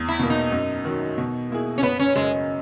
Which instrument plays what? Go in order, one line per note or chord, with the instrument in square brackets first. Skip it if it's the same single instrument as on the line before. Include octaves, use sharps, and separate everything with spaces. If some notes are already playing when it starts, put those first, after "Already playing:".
Already playing: [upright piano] E2
[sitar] E4
[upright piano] B2 A#3
[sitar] D#4
[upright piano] F#2
D#3 F#3
B2
A#3 E4 G#4
[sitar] C#4
[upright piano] F#1 [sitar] B3
[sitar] C#4
[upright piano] F#2 C#3 [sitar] G#3